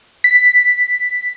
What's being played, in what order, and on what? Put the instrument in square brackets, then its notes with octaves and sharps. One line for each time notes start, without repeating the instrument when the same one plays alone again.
[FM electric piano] B6